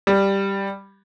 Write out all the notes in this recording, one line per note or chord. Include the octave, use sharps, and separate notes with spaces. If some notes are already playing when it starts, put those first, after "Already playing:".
G3